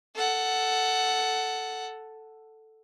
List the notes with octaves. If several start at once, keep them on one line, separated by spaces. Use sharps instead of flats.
A4 F#5